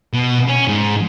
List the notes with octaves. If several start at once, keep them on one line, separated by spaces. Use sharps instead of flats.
B2
C#4
G#2